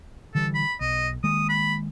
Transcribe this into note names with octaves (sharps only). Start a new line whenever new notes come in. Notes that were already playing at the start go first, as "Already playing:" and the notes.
D3 E3 G3 A4
B5
B1 D#5
D#3 G#3 A#3 D#6
B5